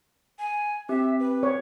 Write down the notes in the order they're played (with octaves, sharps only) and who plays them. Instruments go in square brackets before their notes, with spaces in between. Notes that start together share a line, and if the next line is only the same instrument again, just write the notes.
[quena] G#5
[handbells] C4 G4 [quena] E5
[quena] B4
[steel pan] C#5